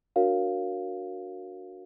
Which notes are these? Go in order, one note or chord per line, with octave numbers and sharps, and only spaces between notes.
D4 F#4 A#4 C#5 F5